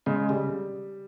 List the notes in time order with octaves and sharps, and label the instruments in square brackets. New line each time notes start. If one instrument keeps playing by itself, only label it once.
[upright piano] C#3 [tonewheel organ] G#3
[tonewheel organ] C#3 [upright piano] G3